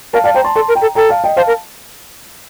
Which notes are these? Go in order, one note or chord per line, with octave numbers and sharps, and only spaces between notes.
A#4 F5 A5
D5 F5 A5
C5 G5 A#5
A5 C6
A4 A5 C6
A#4
G5 A#5
A4
A4 G5 A#5
F5 A5
D#5 G5
C5 F5 A5
A#4